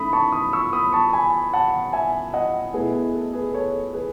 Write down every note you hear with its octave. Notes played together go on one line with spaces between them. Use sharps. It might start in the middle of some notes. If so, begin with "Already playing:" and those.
Already playing: D#3 A3 C#4 E4 B5 D#6
A5 C#6
B5 D#6
C#6 E6
B5 D#6
A5 C#6
G#5 B5
F#5 A5
E5 G#5
D#5 F#5
B2 A3 E4 G#4 B4
G#4
A4
G#4 B4
A4 C#5
G#4 B4